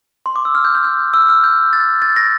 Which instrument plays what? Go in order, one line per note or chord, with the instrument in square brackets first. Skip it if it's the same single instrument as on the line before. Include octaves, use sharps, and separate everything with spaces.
[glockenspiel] C6
D6
E6
F6
G6
G6
F6
E6
F6
G6
A6
A6
A#6